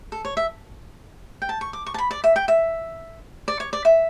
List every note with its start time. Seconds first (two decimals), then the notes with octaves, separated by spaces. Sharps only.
0.12 A4
0.25 C#5
0.37 E5
1.42 G5
1.49 A5
1.61 C#6
1.73 D6
1.86 C#6
1.94 A5
1.98 B5
2.11 D5
2.24 E5
2.36 G5
2.48 E5
3.48 D5
3.60 C#5
3.73 D5
3.85 E5